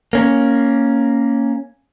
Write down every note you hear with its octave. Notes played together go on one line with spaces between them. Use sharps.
A#3 C#4